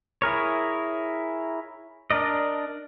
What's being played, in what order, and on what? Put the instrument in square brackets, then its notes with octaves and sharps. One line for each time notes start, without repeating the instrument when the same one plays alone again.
[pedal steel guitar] E4 G#4 A#4 C#5
D4 A#4 D5 D#5